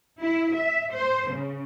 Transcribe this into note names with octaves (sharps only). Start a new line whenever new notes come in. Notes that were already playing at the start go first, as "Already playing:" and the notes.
E4
E5
C5
C#3